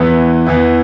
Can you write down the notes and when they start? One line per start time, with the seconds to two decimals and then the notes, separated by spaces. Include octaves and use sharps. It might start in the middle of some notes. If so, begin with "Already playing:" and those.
Already playing: E2 E3 B3 E4
0.46 E2 E3 B3 E4